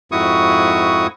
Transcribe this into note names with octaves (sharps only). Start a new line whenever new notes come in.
F2 G#2 E4 F#4 C#6 D#6